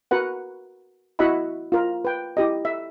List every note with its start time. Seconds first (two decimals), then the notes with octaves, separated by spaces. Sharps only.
0.11 F#4 A#4 B4 F#5
1.19 E4 F#4 D#5 E5 F#5 B5
1.72 F4 A#4
2.05 B4 G5
2.37 E4 G4 D#5
2.65 E5